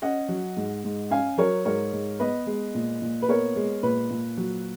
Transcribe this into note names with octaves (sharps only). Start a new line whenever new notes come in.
C#4 D#5 F#5
F#3
G#2
G#2
C#4 F5 G#5
F#3 A#4 C#5
G#2 A#4 C#5
G#2
B3 B4 D#5
G#3
A#2
A#2
B4
B3 A#4 C#5
G#3
A#2 B4
A#2
F#3